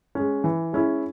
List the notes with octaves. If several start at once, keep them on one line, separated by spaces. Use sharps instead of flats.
G#3 C#4
E3
G#3 C#4 E4